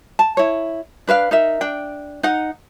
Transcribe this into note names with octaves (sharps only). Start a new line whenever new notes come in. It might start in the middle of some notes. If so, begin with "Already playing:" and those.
A5
E4 C#5
D4 B4 E5 F5
D#4 A#4 E5
D4 G5
D#4 D#5 F#5